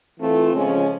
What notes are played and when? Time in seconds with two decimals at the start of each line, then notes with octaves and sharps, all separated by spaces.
0.18 E3 A3 C4 F4 A4
0.52 C#3 F3 G#3 C#4